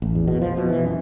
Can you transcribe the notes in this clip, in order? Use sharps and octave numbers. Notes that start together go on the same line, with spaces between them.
A1
E2
B2
F3
B2
E3
F#2